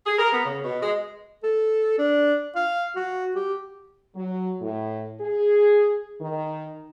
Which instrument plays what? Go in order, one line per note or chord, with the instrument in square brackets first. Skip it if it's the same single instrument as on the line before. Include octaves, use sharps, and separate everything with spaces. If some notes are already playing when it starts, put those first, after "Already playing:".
[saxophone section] G#4
A#4
B3
C#3
B2
G#3
[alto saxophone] A4
D4
F5
F#4
G4
[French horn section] F#3
A2
G#4
D#3